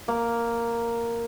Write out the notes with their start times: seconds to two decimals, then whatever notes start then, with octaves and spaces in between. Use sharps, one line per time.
0.08 A#3